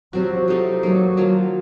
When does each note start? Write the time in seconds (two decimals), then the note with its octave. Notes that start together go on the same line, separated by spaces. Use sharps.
0.13 C3 F3 F#3 C4 F#4
0.48 C3 F3 A3 D#4
0.83 F#3 A#3 D#4 A4
1.17 D#3 F#3 A#3 F4